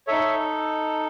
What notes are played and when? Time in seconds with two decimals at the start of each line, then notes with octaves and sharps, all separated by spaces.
0.07 D#4 A4 C#5 E5